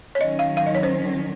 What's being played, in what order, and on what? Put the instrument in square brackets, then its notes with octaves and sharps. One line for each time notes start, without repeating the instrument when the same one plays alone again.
[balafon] C#5
[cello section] D#3 F#3 C#4 [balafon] D#5
[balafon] F5
F5
D#5
C#5
C5